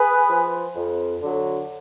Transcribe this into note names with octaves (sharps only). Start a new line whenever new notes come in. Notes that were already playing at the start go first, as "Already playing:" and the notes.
Already playing: G#4 B4
F3
F2
D3 F#3